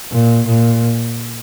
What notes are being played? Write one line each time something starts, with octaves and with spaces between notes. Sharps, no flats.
A#2
A#2